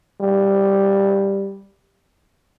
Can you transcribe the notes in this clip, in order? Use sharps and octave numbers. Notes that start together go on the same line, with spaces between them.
G3